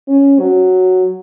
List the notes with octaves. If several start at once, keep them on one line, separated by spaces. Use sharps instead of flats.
C#4
F#3